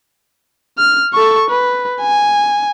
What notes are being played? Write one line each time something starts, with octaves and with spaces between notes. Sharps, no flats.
F6
A4 C#6
B4
G#5